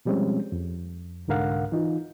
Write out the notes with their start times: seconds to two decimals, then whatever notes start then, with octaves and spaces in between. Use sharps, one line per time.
0.05 B2 F3 G3 G#3 C4 C#4
0.52 F2
1.28 C2 G#2 D3 A#4 F5 F#5
1.72 E3 D#4 F4